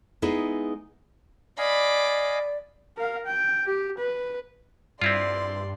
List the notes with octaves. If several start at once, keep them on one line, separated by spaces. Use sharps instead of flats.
G#3 B3 D#4 E4 G#4
D5 D#5 F5 G#5 B5 D6
A#4 F5
G5
G4
B4
G2 C4 E4 F4 D5 C6